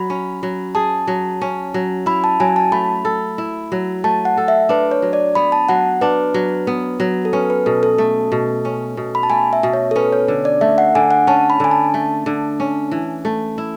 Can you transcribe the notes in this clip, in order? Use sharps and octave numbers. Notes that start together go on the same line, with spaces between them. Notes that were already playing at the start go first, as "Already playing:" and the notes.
Already playing: F#3 B5
C#4
F#3
G#4 A5
F#3
C#4
F#3
E4 B5
A5
F#3 G#5
A5
A3 B5
A4
E4
F#3
A3 A5
F#5
A4
E5
D4 B4
C#5
F#3
D5
B3 B5
A5
F#3 F#5
D4 B4
F#3
B3
F#3
A4
C#4 B4
B4
B2 A4
A4
A3
B2
C#4
B2
B5
A5
A3 G#5
E5
B2
C#5
A4
C#4 B4
C#5
D3
D5
A3 E5
F#5
D3 G#5
F#5
C#4 A5
B5
D3 G#5
A5
A3
D3
C#4
E3
A3
E4